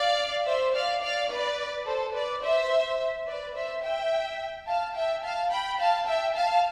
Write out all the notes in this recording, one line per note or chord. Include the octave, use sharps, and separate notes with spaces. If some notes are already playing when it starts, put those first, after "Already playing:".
Already playing: D5 F5
C5 E5
D5 F5
D5 F5
B4 D5
A4 C5
B4 D5
C5 E5
B4 D5
C5 E5
E5 G5
F5 A5
E5 G5
F5 A5
G5 B5
F5 A5
E5 G5
F5 A5